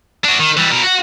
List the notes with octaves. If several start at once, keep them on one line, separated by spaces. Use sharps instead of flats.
D4 F#4
D#3
E3 G3
B2 A#4
F#4 F#5